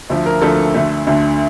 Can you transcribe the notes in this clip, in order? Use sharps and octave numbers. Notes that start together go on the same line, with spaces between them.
D2 D3 F3 A3
A#4
D2 D3 F3 A3 A4
D2 D3 A3
D2 D3 A3